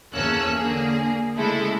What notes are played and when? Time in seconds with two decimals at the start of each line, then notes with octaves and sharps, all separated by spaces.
0.14 E2 A#3 C#4 A4 E6 F#6
0.56 D3 A#3 G#4
1.38 C#3 G#3 A3 E4 A4